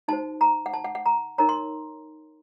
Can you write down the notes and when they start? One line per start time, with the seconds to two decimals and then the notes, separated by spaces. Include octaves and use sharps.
0.08 D#4 F#4 C5 A5
0.41 A#5
0.66 F#5
0.73 A5
0.84 F#5
0.95 F#5
1.06 A#5
1.38 D#4 A#4 C#5 A#5
1.49 C6